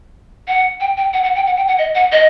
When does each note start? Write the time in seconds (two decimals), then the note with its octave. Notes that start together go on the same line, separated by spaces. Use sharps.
0.48 F#5
0.80 G5
0.97 G5
1.13 F#5
1.24 F#5
1.36 G5
1.47 F#5
1.57 G5
1.68 F#5
1.79 D#5
1.95 F#5
2.12 D#5